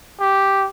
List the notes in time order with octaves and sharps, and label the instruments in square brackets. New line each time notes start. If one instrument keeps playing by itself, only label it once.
[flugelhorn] G4